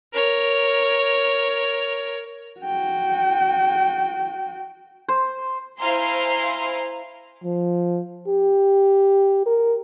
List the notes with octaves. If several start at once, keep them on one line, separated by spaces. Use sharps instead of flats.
A#4 C#5
F#4 G5
C5
E4 C5 F5 G#5 A#5 C6
F3
G4
A#4